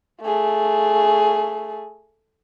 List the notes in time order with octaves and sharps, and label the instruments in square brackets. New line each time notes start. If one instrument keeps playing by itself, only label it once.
[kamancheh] A3 G#4